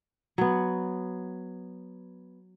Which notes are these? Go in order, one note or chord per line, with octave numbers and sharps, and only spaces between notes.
F#3 B3